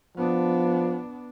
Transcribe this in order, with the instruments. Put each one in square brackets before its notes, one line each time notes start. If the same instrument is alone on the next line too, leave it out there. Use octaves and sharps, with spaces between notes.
[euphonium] F3 [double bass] B3 D4